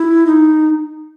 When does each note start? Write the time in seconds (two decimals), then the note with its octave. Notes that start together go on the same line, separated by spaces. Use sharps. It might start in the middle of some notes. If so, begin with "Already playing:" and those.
Already playing: E4
0.27 D#4